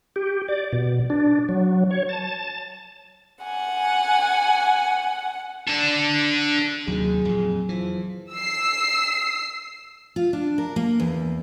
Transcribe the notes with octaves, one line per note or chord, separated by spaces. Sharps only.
G4
D5
B2
D4
F#3
C#5
A5
F#5 G#5
D4 A4
D#2 C3 D#3 F#3 G#4
F2 A#2
E3 F3
E6 C7
F4
D4
A#4
A#3
E2